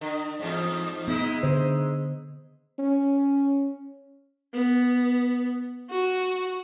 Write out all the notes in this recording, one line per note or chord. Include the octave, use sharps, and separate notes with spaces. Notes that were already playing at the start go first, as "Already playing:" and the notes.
D3
E2 G#2
G#3 B3 D#4 E4
D3 C5
C#4
B3
F#4